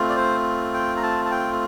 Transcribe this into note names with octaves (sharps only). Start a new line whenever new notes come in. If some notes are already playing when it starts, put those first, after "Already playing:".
Already playing: A3 C4 F4
D5
C5
G5
A#5
A5
A5
G5